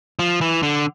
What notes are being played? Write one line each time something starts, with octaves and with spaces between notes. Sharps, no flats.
F3
E3
D3